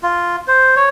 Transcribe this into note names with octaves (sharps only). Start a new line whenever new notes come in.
F4
C5
C#5